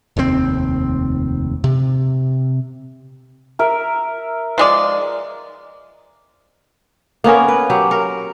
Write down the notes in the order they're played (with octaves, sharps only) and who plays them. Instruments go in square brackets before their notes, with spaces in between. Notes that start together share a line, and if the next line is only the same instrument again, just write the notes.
[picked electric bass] F1 D#2 B2 C4
C3
[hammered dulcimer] A#4 E5
[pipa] F3 G#3 D5
[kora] A#3 B3 C#4 A#4
B4
F#3 G4
A#4